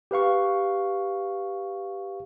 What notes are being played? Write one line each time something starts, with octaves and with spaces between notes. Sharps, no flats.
G4 B4 F5 C#6